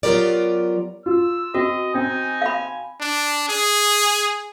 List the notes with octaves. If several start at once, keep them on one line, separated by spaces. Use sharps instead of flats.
F#3 B3 F4 G4 A#4 D5
F4 E6
C4 F#4 D#5
C4 D#4 G#5
F5 B5
D4
G#4